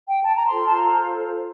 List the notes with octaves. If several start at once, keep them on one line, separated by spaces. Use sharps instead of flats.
G5
A5
A#5
F4 A4 C5 C6
A5
A#5